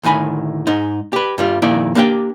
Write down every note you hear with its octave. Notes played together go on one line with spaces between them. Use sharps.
D2 A2 D#3 G#5 B5
G#2 D#4
G4 B4
G2 G3 F4
F2 A#2 D#3 E4 D5
A#3 D4 G4 F5 G5